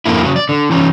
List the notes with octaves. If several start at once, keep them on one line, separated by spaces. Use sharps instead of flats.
F2 D3 A#3 E4
C#3 F#3
D5
D3
E3 C#4 D#4